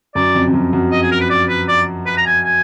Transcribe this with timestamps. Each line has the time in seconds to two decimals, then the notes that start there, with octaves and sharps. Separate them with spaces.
0.15 F#2 D5
0.35 F2
0.47 F2
0.54 F#2
0.73 F#2
0.92 D#5
1.02 G#4
1.12 A#4
1.21 B4
1.30 D5
1.49 B4
1.68 D5
2.06 B4
2.18 A#5
2.26 G#5
2.44 G#5